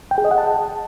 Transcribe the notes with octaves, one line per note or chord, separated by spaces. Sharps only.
G5
G#4
D#5
F#5
A5